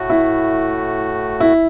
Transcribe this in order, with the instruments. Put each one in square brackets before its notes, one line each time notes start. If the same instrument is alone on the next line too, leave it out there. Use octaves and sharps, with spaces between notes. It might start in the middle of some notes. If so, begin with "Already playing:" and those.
Already playing: [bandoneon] A2 A3 F#4
[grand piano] E4
E4